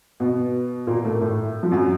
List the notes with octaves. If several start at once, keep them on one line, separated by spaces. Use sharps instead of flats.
B2 B3
A#2 A#3
A2 A3
A2 A3
F3
F#2 F#3